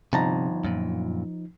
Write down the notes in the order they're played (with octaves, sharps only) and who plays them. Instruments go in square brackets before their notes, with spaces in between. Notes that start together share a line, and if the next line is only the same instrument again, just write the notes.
[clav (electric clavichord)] G1 A5 A#5 [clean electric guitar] C3 [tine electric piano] F3 D#4
[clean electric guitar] F#2 A#2